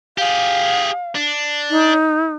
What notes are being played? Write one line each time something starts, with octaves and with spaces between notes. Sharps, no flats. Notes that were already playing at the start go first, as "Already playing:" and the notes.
G4 G#4 F5
D4
D#4